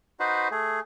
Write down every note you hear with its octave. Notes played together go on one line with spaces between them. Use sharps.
D#4 F#4 B4 C5
A3 G#4